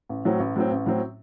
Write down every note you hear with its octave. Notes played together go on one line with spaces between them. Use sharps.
A1
A2 F#3 C4
A1
A2 F#3 C4
A1
A2 F#3 C4